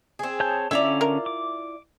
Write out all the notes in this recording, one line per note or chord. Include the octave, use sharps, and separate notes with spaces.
C4 G#4
C#5 A5 G6
D3 C#4 E4 F4 D5 E5 A#5
A#4
D6